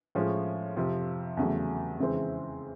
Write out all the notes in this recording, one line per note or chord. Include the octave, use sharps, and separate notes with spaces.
A2 F3 G#3 C#4
F2 C3 F3
E2 C#3 F#3 A3
F2 C#3 E3 G#3 C4